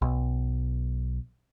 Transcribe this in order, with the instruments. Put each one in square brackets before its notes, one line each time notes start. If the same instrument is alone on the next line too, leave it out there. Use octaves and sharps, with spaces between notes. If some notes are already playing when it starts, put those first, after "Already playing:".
[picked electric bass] B1